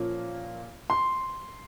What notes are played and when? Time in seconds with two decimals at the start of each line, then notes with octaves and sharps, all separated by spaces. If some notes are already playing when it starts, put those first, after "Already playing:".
Already playing: A#2 F3 A#3 C#4
0.90 C6